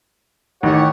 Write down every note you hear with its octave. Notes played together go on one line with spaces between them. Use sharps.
A1 D#3 G4 C#5 F#5